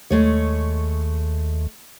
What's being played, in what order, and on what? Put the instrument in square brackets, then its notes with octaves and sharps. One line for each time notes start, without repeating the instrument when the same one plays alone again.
[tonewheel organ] D#2 [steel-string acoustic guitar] G#3 A3 C#5